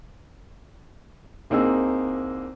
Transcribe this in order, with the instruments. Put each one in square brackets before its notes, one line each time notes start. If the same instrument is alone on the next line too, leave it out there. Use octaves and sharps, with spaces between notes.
[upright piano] C2 A#3 C4 D#4 G#4 E6